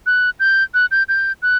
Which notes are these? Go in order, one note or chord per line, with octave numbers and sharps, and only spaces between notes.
F#6
G6
F#6
G6
G6
F#6